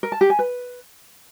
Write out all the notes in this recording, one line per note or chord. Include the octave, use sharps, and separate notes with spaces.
A#4
A5
G4
G#5
B4